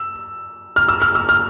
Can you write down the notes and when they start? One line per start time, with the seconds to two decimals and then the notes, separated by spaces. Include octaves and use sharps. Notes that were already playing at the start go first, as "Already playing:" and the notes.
Already playing: E6
0.76 F6
0.88 E6
1.02 F6
1.15 E6
1.29 F6